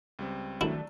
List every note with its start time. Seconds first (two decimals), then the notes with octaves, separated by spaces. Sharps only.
0.19 C#2 G3 C4
0.61 D#3 F#3 A3 D4 E4